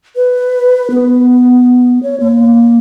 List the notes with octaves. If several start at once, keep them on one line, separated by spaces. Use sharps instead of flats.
B4
B3
C#5
A#3